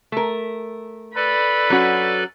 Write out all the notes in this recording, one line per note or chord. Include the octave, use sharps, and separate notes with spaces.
A3 A#4
A4 B4 D5 B5
F#3 C#4 F#4